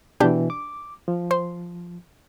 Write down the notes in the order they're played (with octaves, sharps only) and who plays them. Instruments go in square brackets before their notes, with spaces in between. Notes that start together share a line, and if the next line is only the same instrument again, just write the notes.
[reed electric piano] B2 E3 [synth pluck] D4 G4 G5
[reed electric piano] D6
F3
[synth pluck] C5 C6